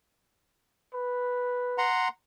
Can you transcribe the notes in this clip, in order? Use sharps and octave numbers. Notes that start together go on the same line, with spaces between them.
B4
F#5 A#5 C6